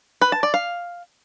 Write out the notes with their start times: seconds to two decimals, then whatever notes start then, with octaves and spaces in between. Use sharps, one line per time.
0.21 B4
0.32 A5
0.43 D5
0.54 F5